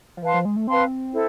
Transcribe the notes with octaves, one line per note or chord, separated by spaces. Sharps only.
F3
E3 B4 F5 A5 C6
F3
G#3
A3
C4 B4 F5 A5 C6
E4 A4 C5